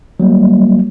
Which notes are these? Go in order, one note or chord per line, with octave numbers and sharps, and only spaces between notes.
F#3 G3 A#3